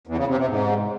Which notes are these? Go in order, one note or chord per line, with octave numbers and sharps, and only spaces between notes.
E2
C#3
C3
C3
G#2